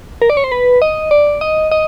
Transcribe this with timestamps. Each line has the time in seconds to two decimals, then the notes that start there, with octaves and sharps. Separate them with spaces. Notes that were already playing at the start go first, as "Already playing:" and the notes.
0.22 A#4
0.30 D5
0.37 C#5
0.44 C5
0.52 B4
0.82 D#5
1.11 D5
1.41 D#5
1.71 D#5